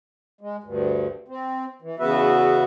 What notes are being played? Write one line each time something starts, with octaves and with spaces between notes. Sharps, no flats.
G#3
D2 G2
C4
E3
E2 C#3 B3 F#4 B4 E5